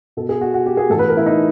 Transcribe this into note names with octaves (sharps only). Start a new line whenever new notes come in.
B2 A4
G#4
F#4
F#4
G4
G#4
A2 E3 A4
B4
A#4
E4
D#4